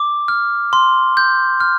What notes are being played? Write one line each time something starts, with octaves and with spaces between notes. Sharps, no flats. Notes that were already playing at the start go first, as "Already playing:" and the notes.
Already playing: D6
F6
C6
G6
F6